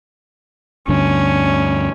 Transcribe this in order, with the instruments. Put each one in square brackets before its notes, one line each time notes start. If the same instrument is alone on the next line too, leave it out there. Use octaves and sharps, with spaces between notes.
[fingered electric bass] D2 G2 D3 [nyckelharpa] C#4